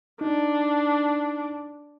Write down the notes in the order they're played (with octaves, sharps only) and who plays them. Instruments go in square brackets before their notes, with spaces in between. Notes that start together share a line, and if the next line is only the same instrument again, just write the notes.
[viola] D4 [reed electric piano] D#4